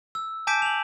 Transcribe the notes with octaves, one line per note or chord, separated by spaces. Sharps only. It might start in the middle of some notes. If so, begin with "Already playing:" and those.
E6
G#5 A5 D6 G6 B6 D7
F7 F#7